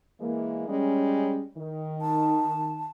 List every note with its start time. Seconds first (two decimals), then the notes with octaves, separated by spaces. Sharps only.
0.21 E3 G#3 A#3
0.68 G3 G#3 C#4
1.58 D#3
2.01 A5